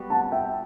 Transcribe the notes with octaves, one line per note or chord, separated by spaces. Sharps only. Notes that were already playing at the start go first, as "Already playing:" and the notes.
Already playing: G3 B3 F#4
F#5 A5
E5 G5